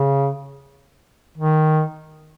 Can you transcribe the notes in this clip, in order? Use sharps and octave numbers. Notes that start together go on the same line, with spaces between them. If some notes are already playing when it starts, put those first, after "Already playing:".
Already playing: C#3
D#3